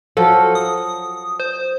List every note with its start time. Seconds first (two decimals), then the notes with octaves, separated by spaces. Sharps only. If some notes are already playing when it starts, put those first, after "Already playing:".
0.17 F3 F#3 F4 A4
0.55 D#6
1.40 C5